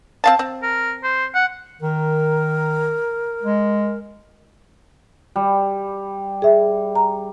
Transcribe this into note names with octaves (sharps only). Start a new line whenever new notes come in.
C4 F5 A5
C4
A#4
C5
F#5
D#3 A#4
G#3
G3
G#4 E5
A#5